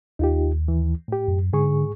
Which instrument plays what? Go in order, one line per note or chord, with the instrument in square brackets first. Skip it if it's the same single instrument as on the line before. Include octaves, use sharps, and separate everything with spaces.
[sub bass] D#2 [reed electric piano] D#4 F4 G4
[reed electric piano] E3
A2 G4
[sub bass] F#2
[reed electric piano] G#2 G#4 C#6 [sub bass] D3